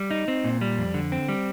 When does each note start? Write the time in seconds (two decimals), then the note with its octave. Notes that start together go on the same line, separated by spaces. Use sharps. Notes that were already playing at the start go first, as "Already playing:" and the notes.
Already playing: G3
0.11 D#4
0.28 C4
0.45 A#2
0.61 G3
0.78 F2
0.94 D3
1.12 C4
1.29 G3